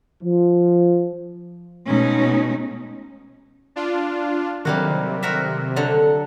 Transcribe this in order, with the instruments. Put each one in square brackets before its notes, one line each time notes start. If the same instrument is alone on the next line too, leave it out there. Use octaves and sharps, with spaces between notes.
[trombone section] F3
[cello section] B2 G#3 A3 C#4 D#4
[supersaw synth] D4 F4
[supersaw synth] C3 [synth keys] D#3 F#3 [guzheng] G3 A#3 F#4
[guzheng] F#4 A#4 E5
D3 F#3